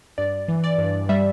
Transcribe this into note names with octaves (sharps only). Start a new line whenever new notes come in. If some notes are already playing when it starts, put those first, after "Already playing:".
G2 D5
E3
D5
G2
G3 E5